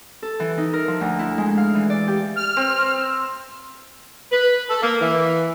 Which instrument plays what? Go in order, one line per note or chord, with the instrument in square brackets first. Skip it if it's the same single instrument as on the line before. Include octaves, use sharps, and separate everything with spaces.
[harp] A4
E3
D#4
A#4
F3
D2
E4
G#3
F5
E3
D5
G4
[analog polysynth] F6
[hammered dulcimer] C4
[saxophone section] B4
A4
A#3
E3